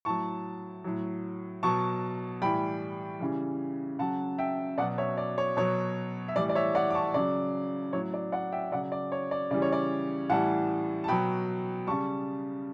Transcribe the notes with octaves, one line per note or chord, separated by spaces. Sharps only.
A2 F#3 A5 C#6
A2 F#3
B2 F#3 A5 C#6
A2 E3 G3 G5 B5
C#3 E3 G3
C#3 F#3 F#5 A5
E5 G5
B2 F#3 D5 F#5
C#5 E5
D5
C#5
B2 F#3 C#5
E5
A2 E3 G3 D5
D5
C#5 E5
D5 F#5
D6
A5 C#6
C#3 F#3 D5
A2 F#3 C#5
D5
D5 F#5
E5 G5
C#3 F#3 D5 F#5
D5
C#5
D5
C#3 E3 G3 D5
C#5
D5
A2 E3 G3 F#5 A5
A5
B2 F#3 G5 B5
C#3 G3 A5 C#6